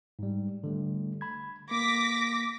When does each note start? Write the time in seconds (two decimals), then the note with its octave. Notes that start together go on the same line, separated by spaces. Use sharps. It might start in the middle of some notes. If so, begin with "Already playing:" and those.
0.19 G#2 G3
0.64 D3 G3 A3
1.21 B5 G#6
1.71 A#3 D6 A#6 B6